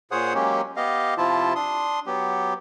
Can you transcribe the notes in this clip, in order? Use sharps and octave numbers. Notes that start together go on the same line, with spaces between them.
A#2 G#4 C5 C#5 F#5 D#6
F#3 G#3 A#3 C#4 G4
B3 G4 D#5 F5
C3 F3 E4 F4 A5
D4 C6 D#6
F#3 B3 G4